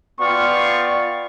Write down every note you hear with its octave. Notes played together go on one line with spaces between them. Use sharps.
B3 F4 D5 F5 G5 C#6